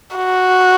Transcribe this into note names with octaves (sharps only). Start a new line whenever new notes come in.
F#4